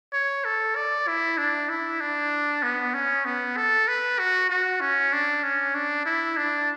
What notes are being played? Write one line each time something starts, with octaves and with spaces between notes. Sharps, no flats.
C#5
A4
D5
E4
D4
E4
D4
B3
C#4
B3
A4
B4
F#4
F#4
C#4
D4
C#4
D4
E4
D4